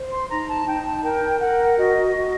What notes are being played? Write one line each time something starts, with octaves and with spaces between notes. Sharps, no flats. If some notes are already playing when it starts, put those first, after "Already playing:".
Already playing: C5
C6
D#4 A#5
A5
D#4 G5
A5
A#4 G5
A#4 F#5
F#4 D#5
F#4